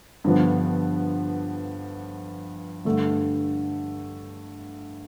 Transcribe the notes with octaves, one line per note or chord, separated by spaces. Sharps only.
G2 D3 F3 B3
G2 D3 A3